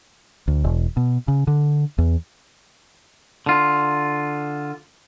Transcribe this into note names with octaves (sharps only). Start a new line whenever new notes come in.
D2
E1
B2
C#3
D3
E2
D3 F4